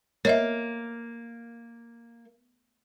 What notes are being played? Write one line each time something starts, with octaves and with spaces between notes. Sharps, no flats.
A#3 C#5 D#5 E5